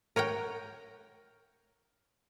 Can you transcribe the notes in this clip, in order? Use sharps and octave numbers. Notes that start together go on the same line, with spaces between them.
A#4 C#5 F#5 G5